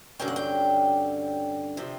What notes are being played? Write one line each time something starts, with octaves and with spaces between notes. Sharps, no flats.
G2 D3 F#3 C#4 G5
F#5
G5
C3 F3